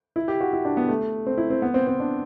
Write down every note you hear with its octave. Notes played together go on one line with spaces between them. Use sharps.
E4
G4
F#4
E4
D4
B3
A3
C4
E4
C4
B3
C4
C4
D4